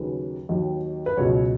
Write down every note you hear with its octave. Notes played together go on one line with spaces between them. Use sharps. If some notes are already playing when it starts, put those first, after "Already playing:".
Already playing: D#2 C#3 F#3 B4
D#2 D#3 F#3
B4
C#2 B2 F#3 C#5